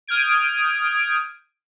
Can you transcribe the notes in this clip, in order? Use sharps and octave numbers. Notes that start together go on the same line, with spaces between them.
D#6 F6 G6 G#6 D7